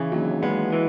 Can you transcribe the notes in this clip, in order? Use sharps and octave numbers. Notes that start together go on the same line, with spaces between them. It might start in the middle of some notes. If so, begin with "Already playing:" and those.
Already playing: C#3 E3
D#2 F#3
G#3 B3
E3